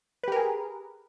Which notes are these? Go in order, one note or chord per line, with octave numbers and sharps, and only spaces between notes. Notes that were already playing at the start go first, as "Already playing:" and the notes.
G4 G#4 A#4 B4